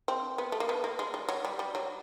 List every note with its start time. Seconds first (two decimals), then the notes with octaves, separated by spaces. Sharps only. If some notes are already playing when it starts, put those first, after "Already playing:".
0.08 C4
0.38 B3
0.52 A3
0.60 A#3
0.69 B3
0.84 A#3
0.99 G#3
1.14 G3
1.29 F#3
1.45 G3
1.59 G3
1.75 F#3